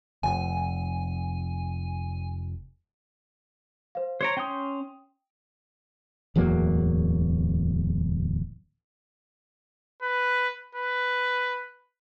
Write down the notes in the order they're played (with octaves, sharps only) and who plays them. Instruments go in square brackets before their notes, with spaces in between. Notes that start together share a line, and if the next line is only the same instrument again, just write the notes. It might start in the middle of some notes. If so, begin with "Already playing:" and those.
[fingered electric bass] F1 [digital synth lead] G#5
[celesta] C5 F5
[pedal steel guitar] C5 C#5 A#5 [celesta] G#6 D7
[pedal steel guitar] C#4 C6 G6 [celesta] G5 D#6
[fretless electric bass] D1 E2 F#3 A#3
[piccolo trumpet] B4
B4